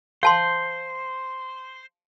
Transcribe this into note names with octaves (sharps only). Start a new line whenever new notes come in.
C5 F5 A5 C6